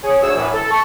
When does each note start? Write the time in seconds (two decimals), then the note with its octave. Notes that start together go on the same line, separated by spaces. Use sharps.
0.04 G#4 C#5
0.22 D2 C#5 E6
0.36 F#2 A2 E3
0.54 A4
0.71 A5 C#6